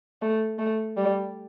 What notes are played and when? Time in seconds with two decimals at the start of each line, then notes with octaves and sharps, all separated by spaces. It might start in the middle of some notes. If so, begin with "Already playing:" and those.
0.22 A3
0.58 A3
0.97 G3